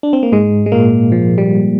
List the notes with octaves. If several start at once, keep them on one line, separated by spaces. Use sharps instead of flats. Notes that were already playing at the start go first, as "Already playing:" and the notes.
D4
C4
A#3
G#2 G#3
G#3
A#2 A#3
F3
G3